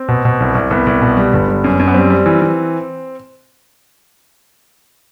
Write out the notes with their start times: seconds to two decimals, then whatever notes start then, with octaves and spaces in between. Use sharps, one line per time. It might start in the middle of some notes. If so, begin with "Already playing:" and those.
Already playing: C4
0.08 B2
0.25 B2
0.40 C2
0.55 C2
0.71 C2 B3
0.87 C2
1.01 B2
1.17 G3
1.33 G1
1.48 G3
1.64 F#2
1.79 F#2
1.88 B3
1.94 G3 C4
2.10 G3
2.26 E3
2.42 E3